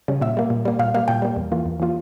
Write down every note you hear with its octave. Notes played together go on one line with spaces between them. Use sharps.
C#3 G3 C#4
A#2 E5
G3 A#3
A#2
G3 A#3
A#2 F5
G3 A#3 F5
A#2 G5
G3 A#3
E2
E3 A#3 F4
E2
E3 A#3 F4